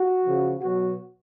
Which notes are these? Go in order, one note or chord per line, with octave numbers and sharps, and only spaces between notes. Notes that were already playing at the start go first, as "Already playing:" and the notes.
Already playing: F#4
C#3 F3
B2 F#3 F#4